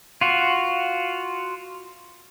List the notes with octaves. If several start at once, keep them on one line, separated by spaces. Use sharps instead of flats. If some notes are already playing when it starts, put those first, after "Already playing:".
F4 F#4